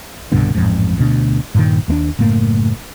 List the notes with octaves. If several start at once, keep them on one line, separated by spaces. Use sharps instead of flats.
C2 G2 B2 D3
A1 F2 G#2
D2 B2 D4
G2 A#2 D#3
D#2 A3 D4
F#1 A2 A3 A#3